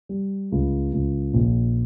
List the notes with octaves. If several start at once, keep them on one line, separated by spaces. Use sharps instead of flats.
G3
C#2
C#2
A#1